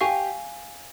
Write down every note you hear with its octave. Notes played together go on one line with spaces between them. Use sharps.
G4 F5 G#5 C#6